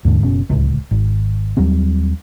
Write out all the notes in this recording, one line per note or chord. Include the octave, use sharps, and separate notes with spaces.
D#2 G#2 D3
F#1 B2 C#4
D1 C#2
G#1
D#2 F#3 G3 C4